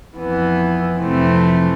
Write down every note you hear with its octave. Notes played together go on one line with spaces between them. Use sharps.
F2 E3 B3
F2 C3 E3 A3 C4